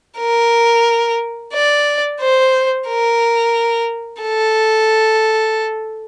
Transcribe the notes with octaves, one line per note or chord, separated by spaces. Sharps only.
A#4
D5
C5
A#4
A4